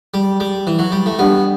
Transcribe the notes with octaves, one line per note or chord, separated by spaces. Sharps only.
G3
G3
E3
F#3
G3
A3
G3 B3 D4 G4